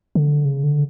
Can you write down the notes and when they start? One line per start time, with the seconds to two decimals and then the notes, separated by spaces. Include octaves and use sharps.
0.15 D3
0.45 C#3
0.64 D3